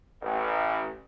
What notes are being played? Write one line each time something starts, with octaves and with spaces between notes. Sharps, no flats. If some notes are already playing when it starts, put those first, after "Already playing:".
A1